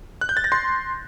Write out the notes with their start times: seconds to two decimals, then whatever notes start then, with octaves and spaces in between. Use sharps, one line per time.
0.21 F#6
0.29 G6
0.37 A6
0.44 A#6
0.52 C6